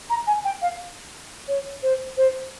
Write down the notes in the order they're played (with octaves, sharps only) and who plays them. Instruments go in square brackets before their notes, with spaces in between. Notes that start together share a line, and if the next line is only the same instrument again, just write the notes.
[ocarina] A#5
G#5
G5
F5
C#5
C5
C5